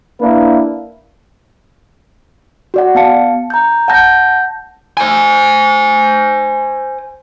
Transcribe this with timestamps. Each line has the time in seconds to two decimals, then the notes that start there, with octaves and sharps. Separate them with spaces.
0.21 A#3 D4 E4 B4
2.74 F#4 D5 F#5
2.95 B3 F5 A5 C#7
3.50 A#5 G6
3.88 F#5 A5 G6 A#6
4.97 C5 G#5